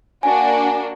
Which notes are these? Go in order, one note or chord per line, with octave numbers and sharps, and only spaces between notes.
A#3 D4 F#4 G#5